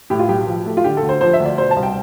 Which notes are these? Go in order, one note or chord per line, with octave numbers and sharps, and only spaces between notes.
A2 G4
F4
B1 G4
F3
A3
F4
D3 G4
A4
D2
C5
F3 C5
E5
D2
D5
B2 C5
A5
C2
G5